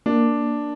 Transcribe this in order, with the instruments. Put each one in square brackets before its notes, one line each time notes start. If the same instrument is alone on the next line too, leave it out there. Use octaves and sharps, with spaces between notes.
[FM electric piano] A#3 [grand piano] D4